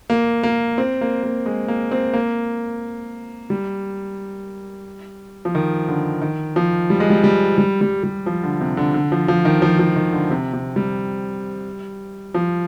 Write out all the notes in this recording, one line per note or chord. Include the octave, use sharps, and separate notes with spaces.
A#3
A#3
C4
A#3
A#3
G#3
A#3
C4
A#3
G3
F3
D#3
D3
D#3
F3
G3
G#3
G3
G3
G3
G3
G3
F3
D3
C3
D3
D3
F3
F3
D#3
F3
F3
D#3
D3
C3
C3
G3
F3